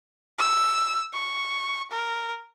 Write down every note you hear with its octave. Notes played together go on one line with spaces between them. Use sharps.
E6
C#6
A#4